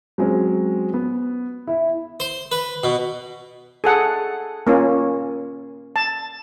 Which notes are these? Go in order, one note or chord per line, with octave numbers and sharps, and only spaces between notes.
F#3 G#3 C4 C#4
B3
E4 E5
C5
B4
B2
G#4 A4 F#5
A#3 C#4 F4
A5